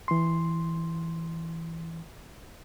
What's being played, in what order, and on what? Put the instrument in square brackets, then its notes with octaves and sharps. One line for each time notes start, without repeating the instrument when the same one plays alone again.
[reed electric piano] E3 C6